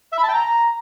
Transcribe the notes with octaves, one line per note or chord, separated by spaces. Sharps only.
E5
B5
A5
G5
A#5